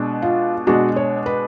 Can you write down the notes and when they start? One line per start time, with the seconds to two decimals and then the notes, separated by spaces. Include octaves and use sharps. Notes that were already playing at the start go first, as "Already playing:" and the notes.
Already playing: B2 G#3 D4
0.22 F4
0.67 B2 G#3 D4 F#4
0.96 C#5
1.26 B4